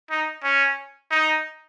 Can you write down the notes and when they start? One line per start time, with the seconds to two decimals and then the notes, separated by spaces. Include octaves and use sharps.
0.11 D#4
0.44 C#4
1.11 D#4